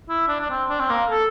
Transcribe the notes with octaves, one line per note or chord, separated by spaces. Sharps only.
E4
D4
D4
C4
D4
C4
A#3
A4